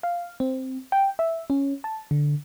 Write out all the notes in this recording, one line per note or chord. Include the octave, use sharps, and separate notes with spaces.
F5
C4
G5
E5
C#4
A5
D3